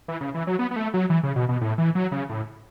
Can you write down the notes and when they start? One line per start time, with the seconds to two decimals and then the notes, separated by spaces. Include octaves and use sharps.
0.08 E3
0.21 C#3
0.34 E3
0.47 F#3
0.59 B3
0.71 B3
0.76 A3
0.94 F#3
1.10 E3
1.23 C#3
1.36 B2
1.49 B2
1.61 A2
1.78 E3
1.95 F#3
2.12 C#3
2.30 A2